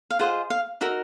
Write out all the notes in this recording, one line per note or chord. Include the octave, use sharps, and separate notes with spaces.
F5
F4 G#4 C5 D#5 F#5
F5
D#4 F#4 A#4 E5